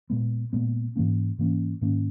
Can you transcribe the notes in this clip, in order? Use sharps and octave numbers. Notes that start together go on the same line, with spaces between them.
A#2 G#3 B3
A#2 G#3 B3
G#2 E3 A#3 C#4
G#2 E3 A#3 C#4
G#2 D#3 A#3 C#4